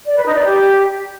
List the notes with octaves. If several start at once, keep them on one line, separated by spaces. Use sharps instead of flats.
D5
B4
D#4
D5
G4